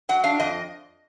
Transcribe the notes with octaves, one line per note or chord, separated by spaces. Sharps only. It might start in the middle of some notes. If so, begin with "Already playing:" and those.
F#3 F#5
D4 F5
F2 D#5